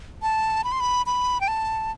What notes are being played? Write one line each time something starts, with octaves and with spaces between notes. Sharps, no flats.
A5
B5
C6
B5
B5
G5
A5